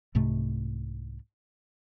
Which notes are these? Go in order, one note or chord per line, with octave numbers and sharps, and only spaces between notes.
C2 G#2 C3 A3